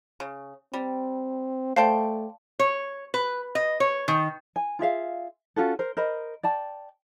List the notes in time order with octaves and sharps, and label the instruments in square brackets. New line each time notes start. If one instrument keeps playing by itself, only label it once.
[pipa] C#3
[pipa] G3 [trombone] C4
[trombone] A3 [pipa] C5 D5 G5 [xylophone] F5 A5
[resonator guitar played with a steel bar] C#5
B4
D#5
C#5
D#3
[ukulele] G#5
F4 G#4 E5 F5
C#4 F4 F#4 A4
A#4 C5
A#4 C5 D#5 B5
D5 G5 A5